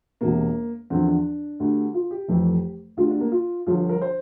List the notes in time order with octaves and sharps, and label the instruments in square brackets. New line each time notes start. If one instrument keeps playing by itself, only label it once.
[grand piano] E1 E2 C3 A#3
E2 D3 F3 C4
D4
D2 D3 G3
F4
G4
F1 F2 E3 G3
D2 D3 G3 F4
D4
A#3
F4
G1 G2 D3 F3 F4
A#4
C5